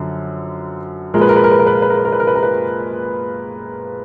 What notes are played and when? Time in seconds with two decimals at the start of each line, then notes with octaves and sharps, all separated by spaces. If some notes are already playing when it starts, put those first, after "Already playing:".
Already playing: F#2 D3 F3
1.14 A#2 F3 G#3 A#4
1.21 B4
1.29 A#4
1.37 B4
1.44 A#4
1.52 B4
1.59 A#4
1.67 B4
1.74 A#4
1.82 B4
1.90 A#4
1.97 B4
2.05 A#4
2.12 B4
2.20 A#4
2.27 B4
2.35 A#4
2.43 B4